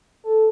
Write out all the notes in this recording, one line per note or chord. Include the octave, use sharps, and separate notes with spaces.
A4